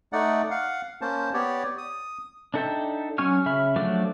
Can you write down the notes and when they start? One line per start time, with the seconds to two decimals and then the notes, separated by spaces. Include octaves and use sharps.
0.13 A3 D#4 D5 F#5
0.51 F5 F#5
1.01 A#3 C#4 C5 A5
1.34 B3 G4 C#5 D5
1.78 D#6
2.54 D4 D#4 A4 E5 G5
3.18 F#3 C#4 G#5 C#6 F6
3.46 C#3 E5 B5 F6
3.76 F3 F#3 A3 D4 D5